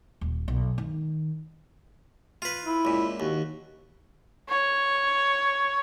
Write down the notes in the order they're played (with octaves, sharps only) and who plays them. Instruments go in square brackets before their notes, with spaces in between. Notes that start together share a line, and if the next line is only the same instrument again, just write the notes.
[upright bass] D#1
B1
D#3
[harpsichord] F4 B4
[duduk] E4
[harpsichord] C#2 A#2
[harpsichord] D#2 [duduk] F#4
[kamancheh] C#5